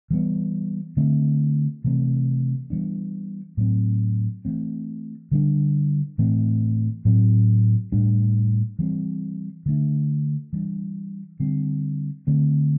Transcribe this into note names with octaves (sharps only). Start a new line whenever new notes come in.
E3 G3 B3
D3 A3 C4
C3 E3 A3 C4
E3 G3 B3 D4
A2 F#3 C4
E3 A3 C4
D3 G3 D4
A2 E3 A3 C4
A2 F#3 C4
A2 G3 D4
E3 G3 C4
D3 A3 D4
E3 G3 D4
D3 G3 C4
D3 A3 C4